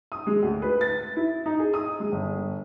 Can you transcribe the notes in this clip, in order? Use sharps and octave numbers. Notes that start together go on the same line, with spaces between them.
D#6
G#3
D2
B4
A6
E4
D#4
G#4
D#6
G#3
G1